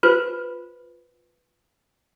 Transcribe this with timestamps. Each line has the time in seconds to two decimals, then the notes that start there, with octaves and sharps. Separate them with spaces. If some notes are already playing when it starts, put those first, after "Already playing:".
0.03 F4 B4 C5